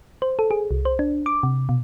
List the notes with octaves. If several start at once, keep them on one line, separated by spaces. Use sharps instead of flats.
C5
A4
G#4
C2
C5
D4
D6
C3
B2